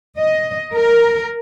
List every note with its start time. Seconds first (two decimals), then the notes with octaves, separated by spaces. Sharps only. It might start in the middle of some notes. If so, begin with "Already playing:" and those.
0.19 D#5
0.74 A#4